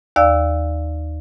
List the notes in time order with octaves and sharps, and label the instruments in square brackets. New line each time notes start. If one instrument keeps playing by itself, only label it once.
[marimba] D#2 D5 F5 E6